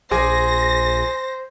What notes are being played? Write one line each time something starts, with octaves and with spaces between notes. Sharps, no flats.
A#1 G#4 C5 G#5 D6 A#6